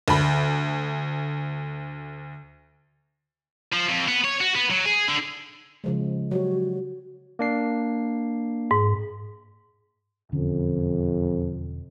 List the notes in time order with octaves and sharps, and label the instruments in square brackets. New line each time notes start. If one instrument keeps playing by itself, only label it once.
[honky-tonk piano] D2 B5
[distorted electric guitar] F3
F2
B3
C#5
F#4
B3
F#3
G#4
D3
[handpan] C#3 F3 G#3
[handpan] F#3 G4 C#5 [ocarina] F#4
[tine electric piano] A#3 D4 C7
[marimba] G#2
[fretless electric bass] E1 D3 C#4 [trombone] F2